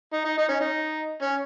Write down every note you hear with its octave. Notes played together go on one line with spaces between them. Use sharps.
D#4
D#4
D#4
C#4
D#4
C#4